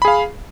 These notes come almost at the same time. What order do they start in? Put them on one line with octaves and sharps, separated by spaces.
B5 G#4 F5